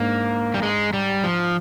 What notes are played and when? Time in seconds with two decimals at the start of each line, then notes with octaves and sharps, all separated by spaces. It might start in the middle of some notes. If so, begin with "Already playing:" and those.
Already playing: G#2 A#3 D4
0.54 G3
0.63 G#3
0.93 G3
1.24 F3